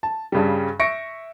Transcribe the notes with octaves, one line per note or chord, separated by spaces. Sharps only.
A5
G2 C#3 G3
E5 C#6 A#6 C#7 D7